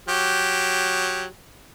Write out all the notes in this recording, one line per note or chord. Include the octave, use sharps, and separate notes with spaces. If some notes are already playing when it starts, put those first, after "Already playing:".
F#3 G4